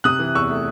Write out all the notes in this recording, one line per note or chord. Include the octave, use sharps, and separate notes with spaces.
C3 D#6 F#6
E3
E2 C#6 E6
A3